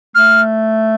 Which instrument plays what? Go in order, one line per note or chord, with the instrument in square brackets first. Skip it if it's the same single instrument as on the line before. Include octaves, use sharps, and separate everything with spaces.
[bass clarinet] A3 [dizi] F6